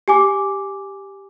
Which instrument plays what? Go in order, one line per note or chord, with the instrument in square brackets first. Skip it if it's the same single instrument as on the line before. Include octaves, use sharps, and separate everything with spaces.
[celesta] G4 G#5 D6